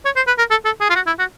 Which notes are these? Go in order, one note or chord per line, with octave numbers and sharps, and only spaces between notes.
C#5
C5
B4
A#4
A4
A4
G#4
F4
F#4
E4
F#4